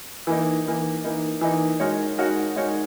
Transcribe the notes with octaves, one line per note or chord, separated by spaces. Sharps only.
E3 A#3 D#4
E3 A#3 D#4
E3 A#3 D#4
E3 A#3 D#4
G#3 D#4 F#4 A#4 C#5
G#3 D#4 F#4 A#4 C#5
G#3 D#4 F#4 A#4 C#5